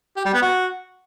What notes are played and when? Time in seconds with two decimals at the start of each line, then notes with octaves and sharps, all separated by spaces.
0.17 G4
0.25 G3
0.34 B3
0.42 F#4